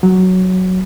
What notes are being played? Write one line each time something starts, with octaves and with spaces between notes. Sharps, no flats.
F#3